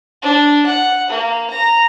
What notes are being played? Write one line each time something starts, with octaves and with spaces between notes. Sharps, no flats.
D4
F#5
A#3
A#5